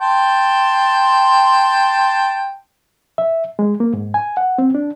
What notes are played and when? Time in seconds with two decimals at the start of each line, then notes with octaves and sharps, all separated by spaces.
0.01 G5 A5 C6
3.18 E5
3.59 G#3
3.80 A#3
3.93 G#2
4.14 G#5
4.37 F#5
4.58 C4
4.75 D4